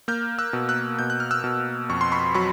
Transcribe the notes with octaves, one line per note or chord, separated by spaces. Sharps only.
A#3 F6 G6
E6 F#6
B2
E6 F#6
B2 G6
F#6
F6
E6 F#6
B2
F2 C#6
C6
B5 C#6
F#3 B5 C#6